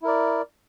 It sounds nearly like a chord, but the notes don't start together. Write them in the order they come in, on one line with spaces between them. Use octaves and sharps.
E4 A#4 D5